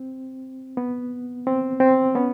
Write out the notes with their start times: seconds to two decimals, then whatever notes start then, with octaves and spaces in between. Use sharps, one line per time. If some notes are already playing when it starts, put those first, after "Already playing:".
Already playing: C4
0.77 B3
1.47 C4
1.80 C4
2.15 B3 C#4